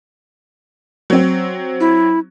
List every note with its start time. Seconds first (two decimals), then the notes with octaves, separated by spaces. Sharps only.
1.10 F#3 C4
1.80 E4